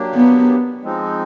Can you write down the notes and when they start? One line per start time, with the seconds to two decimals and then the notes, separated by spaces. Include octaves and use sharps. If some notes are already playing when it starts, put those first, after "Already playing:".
Already playing: F#3 A#3 D4 G4
0.15 B3
0.83 F3 G#3 C4 D#4